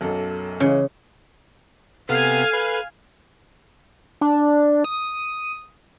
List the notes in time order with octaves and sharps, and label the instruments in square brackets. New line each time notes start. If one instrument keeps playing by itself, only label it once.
[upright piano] B1 F#2 A4
[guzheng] C#3 [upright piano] E3 G#3
[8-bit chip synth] C3 B3 [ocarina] A4 [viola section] F5 G#5
[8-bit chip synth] B4
[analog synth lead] D4
D#6